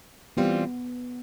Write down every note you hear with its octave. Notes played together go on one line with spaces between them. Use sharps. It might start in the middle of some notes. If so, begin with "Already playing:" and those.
E3 G3 B3 C4 F4